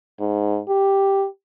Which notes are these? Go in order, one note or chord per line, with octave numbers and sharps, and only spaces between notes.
G#2
G4